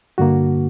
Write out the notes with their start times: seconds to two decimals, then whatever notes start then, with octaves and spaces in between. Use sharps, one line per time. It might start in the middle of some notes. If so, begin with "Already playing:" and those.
0.18 G2 D3 A#3 F#4